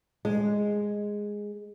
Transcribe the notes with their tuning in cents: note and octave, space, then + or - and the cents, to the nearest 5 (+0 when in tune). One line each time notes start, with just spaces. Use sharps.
G#3 -5